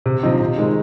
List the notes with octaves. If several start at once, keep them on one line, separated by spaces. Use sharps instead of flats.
C3
F3 C4 D#4
C3
D#3 G#3 D#4